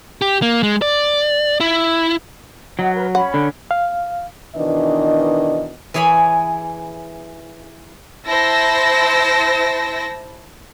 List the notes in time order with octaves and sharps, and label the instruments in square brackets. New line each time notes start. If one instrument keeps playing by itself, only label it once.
[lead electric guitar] G4
A#3
G#3
D5
E4
[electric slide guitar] F#3 [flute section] D#5 F#5
[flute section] A#4 B4
[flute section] C#4 B5 [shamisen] F#5
[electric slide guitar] D3
[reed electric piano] F5
[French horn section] B2 D#3 E3 D4 D#5
[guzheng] E3 G#4 C#5 G#5 B5
[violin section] E4 C5 A5 E6 A#6